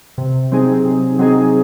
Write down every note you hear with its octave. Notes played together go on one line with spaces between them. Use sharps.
C3
F#3 C4 D#4 G#4
C3
F#3 C4 D#4 G#4